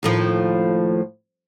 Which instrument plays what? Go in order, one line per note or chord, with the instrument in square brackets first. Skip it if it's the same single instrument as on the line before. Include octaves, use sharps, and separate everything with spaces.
[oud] D#2 A2 F3